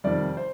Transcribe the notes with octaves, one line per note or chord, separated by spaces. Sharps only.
F2 C3 D#3 G3 D5
C5